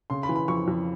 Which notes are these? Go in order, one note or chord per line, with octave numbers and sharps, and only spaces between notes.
C#3 C6
B5
E3
B5
F2 C#6
F2